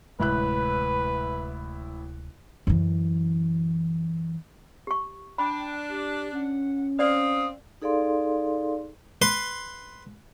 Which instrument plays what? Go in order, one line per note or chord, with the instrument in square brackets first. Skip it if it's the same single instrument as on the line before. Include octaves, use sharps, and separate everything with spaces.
[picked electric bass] D1 C3 G#3 [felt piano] A1 E4 F#6 [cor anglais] B4
[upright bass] F#2 E3
[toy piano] G4 C#6
[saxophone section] D4 [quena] G5 [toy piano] B5
[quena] G4
[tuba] C#4 [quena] F#5
[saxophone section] C4 F5 [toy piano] D5 [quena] D#6
[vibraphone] D#4 G#4 A4 D5 F5 C6
[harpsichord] B4 C6